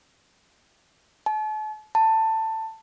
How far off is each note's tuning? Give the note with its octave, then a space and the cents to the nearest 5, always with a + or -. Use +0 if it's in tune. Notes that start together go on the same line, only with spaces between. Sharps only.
A5 -40
A5 +15